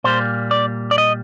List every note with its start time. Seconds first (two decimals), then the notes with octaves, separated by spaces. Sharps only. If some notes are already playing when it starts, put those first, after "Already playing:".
0.04 A#2 G3 A#3 C5
0.51 D5
0.91 D5
0.98 D#5